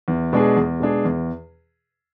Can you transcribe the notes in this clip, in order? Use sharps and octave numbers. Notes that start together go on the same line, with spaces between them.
E2
B2 G#3 D4 G#4
E2
B2 G#3 D4 G#4
E2